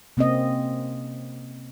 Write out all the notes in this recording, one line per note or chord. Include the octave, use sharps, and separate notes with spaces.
C3 A#3 C4 C#4 D#5